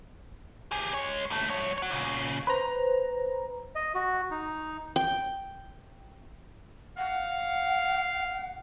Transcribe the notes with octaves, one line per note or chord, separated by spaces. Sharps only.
G4 G#4
G#3 C#5
D#2 A3
C2 C#5
C#5 F#5
A#2 C#3
B4 C5 A#5
D#5
F#4
D#4
G5
F5 F#5